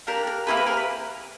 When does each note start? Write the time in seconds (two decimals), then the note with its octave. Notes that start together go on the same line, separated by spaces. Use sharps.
0.07 A#3 D4 G4 A#4
0.27 A#4
0.47 A#3 C#4 E4 G4 B4
0.57 B4
0.66 A#4
0.77 B4